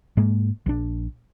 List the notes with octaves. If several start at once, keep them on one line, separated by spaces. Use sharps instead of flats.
G#2 G#3 A#3
A#1 D4